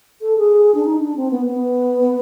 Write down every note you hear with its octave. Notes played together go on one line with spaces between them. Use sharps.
A4
G#4
D4
D#4
D4
C4
B3
B3